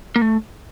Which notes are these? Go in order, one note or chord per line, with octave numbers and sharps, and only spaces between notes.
A#3
A3